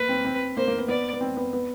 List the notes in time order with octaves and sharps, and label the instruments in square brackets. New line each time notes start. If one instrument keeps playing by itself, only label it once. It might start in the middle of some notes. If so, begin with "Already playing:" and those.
Already playing: [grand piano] A#3 [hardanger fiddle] B4
[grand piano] C4
C4
[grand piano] A#3 [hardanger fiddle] C5
[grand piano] A#3
B3
[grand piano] B3 [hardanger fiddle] D5
[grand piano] B3
C4
B3
B3